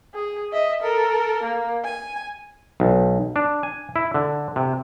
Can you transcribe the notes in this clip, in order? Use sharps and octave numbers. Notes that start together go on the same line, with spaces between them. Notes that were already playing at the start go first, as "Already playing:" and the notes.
G#4
D#5 E5
A4 A#4
A#3
G#5
B1
D4
G#5
E4
D3
C3